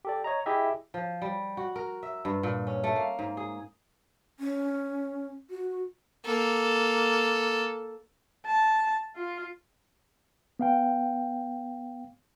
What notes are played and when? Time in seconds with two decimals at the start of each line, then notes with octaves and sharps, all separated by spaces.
0.05 G4 A4 D5
0.24 C#5 D#5 A#5
0.46 E4 G4 G#4 D#5 E5
0.94 F3
1.22 G3
1.57 F#4
1.76 A#4
2.03 E5
2.25 G2
2.43 A#2
2.67 C#4
2.84 A3
2.96 A#3
3.19 G#2
3.37 G#4
4.40 C#4
5.50 F#4
6.25 A#3 A4
8.46 A5
9.16 F4
10.59 B3 F5 G5